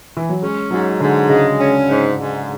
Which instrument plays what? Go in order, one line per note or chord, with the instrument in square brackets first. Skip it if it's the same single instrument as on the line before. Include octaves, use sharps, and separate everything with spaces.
[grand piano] E3
F#3
[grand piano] G#3 [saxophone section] C#4
[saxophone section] G#2 [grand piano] F#3
[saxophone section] G#2 [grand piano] D3
[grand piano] C#3 [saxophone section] G#3
[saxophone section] C#4
G#2
G#2